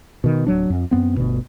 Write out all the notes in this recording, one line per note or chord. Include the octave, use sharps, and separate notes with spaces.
B2 D#3
D1 F#3 D4
F2
F#2 B3 C4
G1 D2 B2